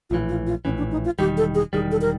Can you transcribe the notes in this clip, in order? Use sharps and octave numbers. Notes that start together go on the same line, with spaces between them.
A#1 A2 E3 F4
F4
F4
A#1 A2 E3 C#4
D4
D#4
F4
E1 D#2 D#3 G3 G4
A4
G#4
E1 D#2 D#3 G3 G#4
A4
A#4